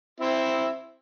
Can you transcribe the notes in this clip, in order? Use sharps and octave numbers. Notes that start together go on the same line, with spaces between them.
C4 E4 E5